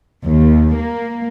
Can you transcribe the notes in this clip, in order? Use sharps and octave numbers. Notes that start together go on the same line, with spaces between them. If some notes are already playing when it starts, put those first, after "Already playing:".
D#2
A#3